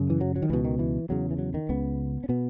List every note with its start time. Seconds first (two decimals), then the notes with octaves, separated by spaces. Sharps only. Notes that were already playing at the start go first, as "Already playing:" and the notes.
Already playing: F#2 C#3
0.10 E3
0.21 F#3
0.36 F#3
0.42 D#3
0.49 C#2 B2 E3
0.65 D#3
0.79 E3
1.09 E2 C#3 F#3
1.31 E3
1.39 F#3
1.54 D#3
1.69 C#2 C#3 B3
2.24 C#4
2.29 B2 B3